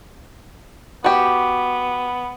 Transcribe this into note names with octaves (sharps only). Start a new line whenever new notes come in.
B3 F#4 G4